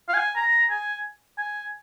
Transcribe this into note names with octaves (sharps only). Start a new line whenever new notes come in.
F5
G#5
A#5
G#5
G#5